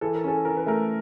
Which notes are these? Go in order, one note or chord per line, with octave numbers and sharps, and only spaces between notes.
E3 A4
A#4
C#4 A4
E3 A#4
B4
A3 A#4